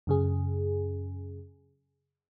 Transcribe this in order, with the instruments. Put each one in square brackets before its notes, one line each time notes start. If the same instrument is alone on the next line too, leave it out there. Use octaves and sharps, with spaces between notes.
[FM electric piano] F#2 C#3 G#4